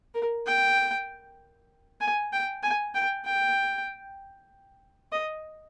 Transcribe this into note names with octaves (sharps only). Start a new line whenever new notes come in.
A#4
G5
G#5
G5
G#5
G5
G5
D#5